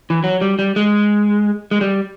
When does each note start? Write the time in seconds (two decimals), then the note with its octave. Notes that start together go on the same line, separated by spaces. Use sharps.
0.10 E3
0.24 F#3
0.41 G3
0.59 G3
0.76 G#3
1.71 G#3
1.81 G3